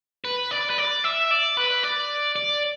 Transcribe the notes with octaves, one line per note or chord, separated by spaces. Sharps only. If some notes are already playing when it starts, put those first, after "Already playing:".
B4
D5
B4
D5
E5
D5
B4
D5
D5